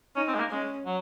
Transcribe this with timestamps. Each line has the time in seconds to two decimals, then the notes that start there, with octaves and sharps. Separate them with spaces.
0.16 C#4 D#4
0.28 C4
0.35 G#3
0.40 A#3
0.51 G#3 C#4
0.86 F#3